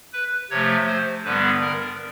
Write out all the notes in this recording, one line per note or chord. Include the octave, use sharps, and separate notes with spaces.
B4
C3 F3 A3 C#5
C5
G2 D3 G3 B3 B4
A#4